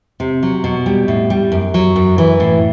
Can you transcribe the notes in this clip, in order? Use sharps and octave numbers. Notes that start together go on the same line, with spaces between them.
C3
F#3
B2
G3
A2
G3
F#2
F#3
F#2
E3
A2